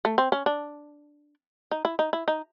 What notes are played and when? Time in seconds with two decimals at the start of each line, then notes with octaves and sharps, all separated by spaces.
0.05 A3
0.18 C4
0.32 C#4
0.46 D4
1.71 D#4
1.85 E4
1.99 D#4
2.13 E4
2.28 D#4